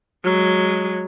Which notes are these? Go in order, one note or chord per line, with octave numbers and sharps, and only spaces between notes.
F#3 G#3